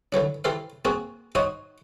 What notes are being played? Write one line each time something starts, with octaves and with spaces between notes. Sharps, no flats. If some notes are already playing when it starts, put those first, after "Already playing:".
D3 E3 F#3 D4
E3 G4 A4 C5 F5
A#3 C4 F#4 G#4
D#4 F#4 C5 C#5 D#5